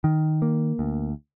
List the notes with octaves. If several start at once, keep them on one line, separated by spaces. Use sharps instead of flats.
D#3
A#3
D2